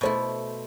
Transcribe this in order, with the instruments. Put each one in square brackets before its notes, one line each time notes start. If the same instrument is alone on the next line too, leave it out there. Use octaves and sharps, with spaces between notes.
[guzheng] B2 A3 E4 [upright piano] C5